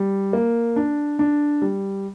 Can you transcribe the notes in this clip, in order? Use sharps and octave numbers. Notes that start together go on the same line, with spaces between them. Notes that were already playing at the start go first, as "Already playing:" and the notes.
Already playing: G3
A#3
D4
D4
G3